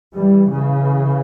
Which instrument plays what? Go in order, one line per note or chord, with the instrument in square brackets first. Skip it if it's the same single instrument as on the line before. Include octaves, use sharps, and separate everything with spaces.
[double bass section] E3 G3
C#3 E3